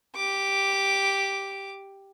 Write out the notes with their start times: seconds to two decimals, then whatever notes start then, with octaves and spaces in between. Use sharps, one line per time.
0.16 G4 D6